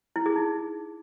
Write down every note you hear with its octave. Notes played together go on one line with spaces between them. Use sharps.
E4
G#4
D#4